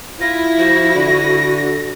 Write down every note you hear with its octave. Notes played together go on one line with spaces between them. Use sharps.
E4 F4 A#6
F3 F#4
D3